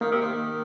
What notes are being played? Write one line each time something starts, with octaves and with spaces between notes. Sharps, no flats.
D#3 A#3
C3
D#3